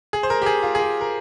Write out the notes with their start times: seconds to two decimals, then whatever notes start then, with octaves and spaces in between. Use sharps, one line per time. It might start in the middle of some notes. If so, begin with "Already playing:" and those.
0.13 G#4
0.23 C5
0.30 A#4
0.42 G4
0.46 G#4
0.63 F4
0.75 G#4
0.79 G4
1.01 A#4